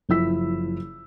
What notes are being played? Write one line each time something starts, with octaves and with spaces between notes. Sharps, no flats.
F#1 F3 E4 E6 B6